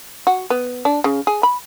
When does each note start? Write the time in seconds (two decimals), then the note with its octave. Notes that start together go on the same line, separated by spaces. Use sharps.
0.27 F#4
0.50 B3
0.85 D4
1.04 C#3
1.27 G#4
1.43 B5